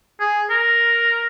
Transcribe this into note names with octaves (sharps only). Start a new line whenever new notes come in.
G#4
A#4